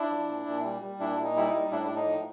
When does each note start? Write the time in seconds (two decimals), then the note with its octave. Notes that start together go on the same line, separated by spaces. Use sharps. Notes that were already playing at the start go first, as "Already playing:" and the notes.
Already playing: D4 E4
0.11 F3
0.29 A#2
0.46 A#2
0.63 G3
0.82 G3
1.00 A#2 D4 E4
1.17 A#2
1.24 D#4
1.36 G3 E4
1.47 D#4
1.54 G3
1.71 A2 D4 E4
1.84 D4
1.89 A2
1.96 D#4
2.06 F3